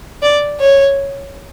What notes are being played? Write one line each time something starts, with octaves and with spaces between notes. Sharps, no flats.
D5
C#5